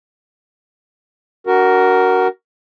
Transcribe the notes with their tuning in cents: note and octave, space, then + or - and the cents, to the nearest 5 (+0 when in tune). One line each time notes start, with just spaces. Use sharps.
D4 -35 F#4 +15 A#4 +0